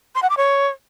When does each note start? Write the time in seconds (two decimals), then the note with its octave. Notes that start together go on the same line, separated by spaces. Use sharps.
0.15 C6
0.23 F#5
0.30 D6
0.37 C#5